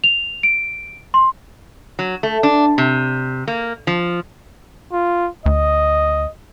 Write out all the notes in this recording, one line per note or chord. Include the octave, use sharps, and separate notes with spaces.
F7
D7
C6
F#3
A3
D4
C3
A#3
F3
F4
D2 D#5